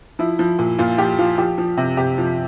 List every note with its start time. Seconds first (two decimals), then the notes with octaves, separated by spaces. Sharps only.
0.19 F3 E4
0.39 F3
0.59 A#2
0.78 A#2 F4
0.98 F3 G4
1.19 F3 F4
1.38 F3 G4
1.58 F3
1.77 C3
1.97 C3 G4
2.18 F3